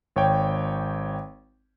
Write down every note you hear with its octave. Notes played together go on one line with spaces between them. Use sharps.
G#1 C#5 G5